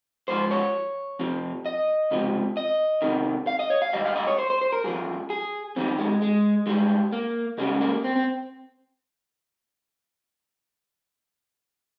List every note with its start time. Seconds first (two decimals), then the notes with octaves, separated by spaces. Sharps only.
0.28 G#2 F3 C5
0.51 C#5
1.19 F2 C3 F3
1.66 D#5
2.11 C#2 C3 F3
2.57 D#5
3.02 C2 C3 D#3
3.47 F5
3.59 D#5
3.70 C#5
3.82 F5
3.93 G2 D#3 G3 D#5
4.05 F5
4.16 D#5
4.27 C#5
4.38 C5
4.50 C5
4.61 C5
4.73 A#4
4.84 G2 F3 G#4
5.30 G#4
5.76 F2 D#3 G3 C4
5.98 G#3
6.22 G#3
6.67 G2 G3 G#3
7.12 A#3
7.58 C#2 C#3 G3 G#3
7.81 A#3
8.04 C4
8.16 C4